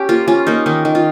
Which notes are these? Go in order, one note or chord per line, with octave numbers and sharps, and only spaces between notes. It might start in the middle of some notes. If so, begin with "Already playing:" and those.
Already playing: C#4 G4
A#3 F4
C#4 F4
A#3 D#4
D#3 D#4
D#3
F4